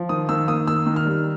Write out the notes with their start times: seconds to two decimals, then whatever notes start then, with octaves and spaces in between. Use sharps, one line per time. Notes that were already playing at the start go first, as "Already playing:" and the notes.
Already playing: F3
0.09 D#3 D#6
0.29 D#3 E6
0.48 A#3 D#6
0.67 D#3 E6
0.87 D#3
0.96 F6
1.05 G3